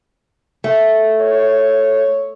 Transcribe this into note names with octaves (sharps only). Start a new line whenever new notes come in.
A3
C#5